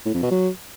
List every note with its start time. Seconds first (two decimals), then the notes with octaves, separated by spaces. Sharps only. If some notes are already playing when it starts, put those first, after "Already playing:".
0.06 A2
0.14 F2
0.22 B2
0.31 F#3